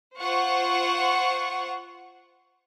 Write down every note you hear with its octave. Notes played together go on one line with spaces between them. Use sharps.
F4 C5 F#5 C#6